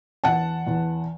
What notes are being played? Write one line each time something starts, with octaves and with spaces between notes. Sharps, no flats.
E2 F#5 A5
E2